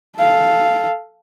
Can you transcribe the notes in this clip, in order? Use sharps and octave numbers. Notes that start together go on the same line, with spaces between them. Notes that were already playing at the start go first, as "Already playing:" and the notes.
A4 F5